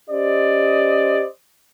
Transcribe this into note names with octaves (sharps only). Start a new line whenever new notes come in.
C#4 G4 C5 D5 D#5